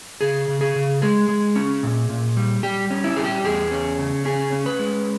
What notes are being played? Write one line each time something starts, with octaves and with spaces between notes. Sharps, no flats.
C#3 G#4
C#3
G#4
C#3
G#3 G#4
G#3
C#4
A#2
A#2
G3
G3 G4
C#4
E4
G3 G#4
G4
E2 G#4
C#4
C#3
C#4 G#4
C#4
B4
G#3